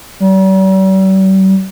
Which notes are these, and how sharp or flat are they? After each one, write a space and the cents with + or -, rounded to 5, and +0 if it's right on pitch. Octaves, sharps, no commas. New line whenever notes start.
G3 -45